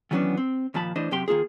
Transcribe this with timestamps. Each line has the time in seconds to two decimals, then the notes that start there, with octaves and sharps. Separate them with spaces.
0.11 D#3 E3 F#3 B3 C#4 D4
0.37 C4
0.74 D#2 A#2 F3 A5 B5
0.96 A2 E3 D4 C5 D#5
1.11 F#2 C3 G4 G5 C6
1.28 D#3 A#3 F4 G#4